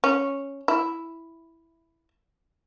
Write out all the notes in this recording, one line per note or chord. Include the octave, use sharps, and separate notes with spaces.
C#4
E4